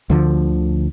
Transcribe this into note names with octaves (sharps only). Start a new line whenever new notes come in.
D2 D3 E3 F3